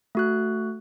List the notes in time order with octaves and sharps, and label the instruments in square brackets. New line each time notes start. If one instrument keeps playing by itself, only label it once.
[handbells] A3 F#4 F#6